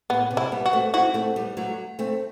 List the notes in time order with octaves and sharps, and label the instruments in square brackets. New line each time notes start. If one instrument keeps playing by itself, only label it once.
[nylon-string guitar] A2 [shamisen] B3
[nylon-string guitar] C3
[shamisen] E4
[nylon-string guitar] G3 B3
[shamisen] F#4
[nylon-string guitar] A3 C4
[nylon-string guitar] C4 E4 [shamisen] F#4
[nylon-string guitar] A3 C4
G3 B3
F#3 A3
A3 C4